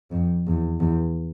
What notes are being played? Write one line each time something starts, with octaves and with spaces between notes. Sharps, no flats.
F2
E2
E2